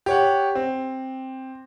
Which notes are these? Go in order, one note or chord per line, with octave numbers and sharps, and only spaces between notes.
G4 C#5 F#5
C4